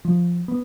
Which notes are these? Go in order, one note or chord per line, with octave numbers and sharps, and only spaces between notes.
F3
B3